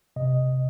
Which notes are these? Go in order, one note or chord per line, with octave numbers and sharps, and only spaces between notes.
C3 D#5